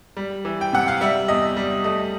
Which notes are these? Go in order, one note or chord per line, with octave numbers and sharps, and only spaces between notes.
G3
E3
G5
C3 F#5
F5
G3 E5
E2 D#5
G3
A3 D#5